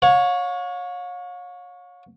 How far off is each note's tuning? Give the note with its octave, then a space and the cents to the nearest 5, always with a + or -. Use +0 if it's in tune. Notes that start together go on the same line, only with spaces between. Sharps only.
C#5 +0 F5 +45